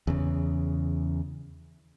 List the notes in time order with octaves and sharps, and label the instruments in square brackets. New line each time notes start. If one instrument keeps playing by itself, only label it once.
[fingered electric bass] E2 C#3